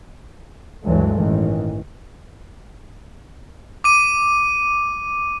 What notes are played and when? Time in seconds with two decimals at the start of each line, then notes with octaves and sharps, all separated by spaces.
0.84 D2 G2 E3 F#3 G#3 A3
1.16 A1 D#3 E3
3.84 D6 D#7